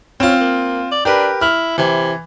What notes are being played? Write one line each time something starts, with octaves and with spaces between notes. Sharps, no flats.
C4 C#4 F4
A#3
D5
D4 G4 A#4 B4
E4 F6
C3 E3